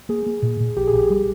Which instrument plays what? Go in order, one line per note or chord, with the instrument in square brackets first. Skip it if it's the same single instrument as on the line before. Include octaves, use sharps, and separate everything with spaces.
[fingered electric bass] A#3 [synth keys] G#4
[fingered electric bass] A#3
A#2
A#2
[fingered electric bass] A#1 [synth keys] G4
[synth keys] G#4
[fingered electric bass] A#1
[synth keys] G4
[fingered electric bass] G3